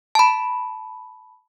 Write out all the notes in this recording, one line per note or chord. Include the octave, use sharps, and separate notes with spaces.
A5 B5